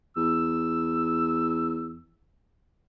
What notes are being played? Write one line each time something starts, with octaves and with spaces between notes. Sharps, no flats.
E2 E6